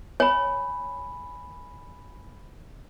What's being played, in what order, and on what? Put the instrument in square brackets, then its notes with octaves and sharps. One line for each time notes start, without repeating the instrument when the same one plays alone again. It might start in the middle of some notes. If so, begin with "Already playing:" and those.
[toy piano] C#5 [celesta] G#5 B5